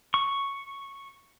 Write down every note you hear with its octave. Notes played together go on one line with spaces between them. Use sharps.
C#6